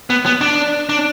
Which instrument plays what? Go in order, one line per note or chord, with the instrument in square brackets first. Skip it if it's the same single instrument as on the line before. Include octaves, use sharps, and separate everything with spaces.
[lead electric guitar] B3
B3
D4
D4